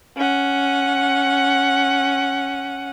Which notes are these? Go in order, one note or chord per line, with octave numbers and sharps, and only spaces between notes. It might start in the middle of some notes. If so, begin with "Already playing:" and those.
C#4 F#5